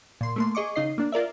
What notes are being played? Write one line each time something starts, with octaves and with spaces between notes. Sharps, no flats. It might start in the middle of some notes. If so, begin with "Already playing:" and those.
A#2 C6
A3 A#3 C6
G#4 D#5 C#6 D6
C#3 D#4 D#5 C7
A#3 D4
F4 A#4 D5 E5